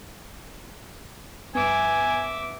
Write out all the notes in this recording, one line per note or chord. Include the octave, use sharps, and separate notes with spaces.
G2 B3 E5 G#5 D6